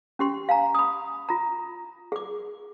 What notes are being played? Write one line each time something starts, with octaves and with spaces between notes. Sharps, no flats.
C#4 G4 C6
F5 G#5 A#5
B5 D#6
F4 A#5
G#4 D6